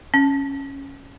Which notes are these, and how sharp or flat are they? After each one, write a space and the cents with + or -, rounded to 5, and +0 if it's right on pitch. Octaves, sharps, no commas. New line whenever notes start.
C#4 -10